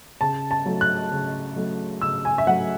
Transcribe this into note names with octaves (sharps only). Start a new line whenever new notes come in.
C#3 A5
A5
F#3 A3
F#6
C#3
F#3 A3
C#3 E6
G#5
E5
F#3 A3 F#5